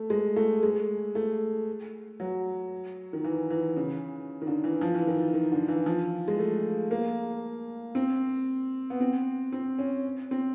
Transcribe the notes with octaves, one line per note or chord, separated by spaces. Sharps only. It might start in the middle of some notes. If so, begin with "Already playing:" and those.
Already playing: A3
G#3
A3
G#3
A3
F#3
D#3
E3
E3
C#3
D#3
D3
E3
F3
E3
D#3
D#3
D3
E3
F3
G#3
A3
A#3
C4
B3
C4
C4
C#4
C4